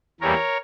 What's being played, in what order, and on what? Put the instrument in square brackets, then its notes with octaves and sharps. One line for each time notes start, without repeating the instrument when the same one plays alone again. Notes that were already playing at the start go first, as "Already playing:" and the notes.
[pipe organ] E2 E3 G3 A#3 A#4 C#5